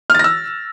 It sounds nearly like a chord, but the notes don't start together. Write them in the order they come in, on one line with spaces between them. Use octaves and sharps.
F6 A6 A#6 E6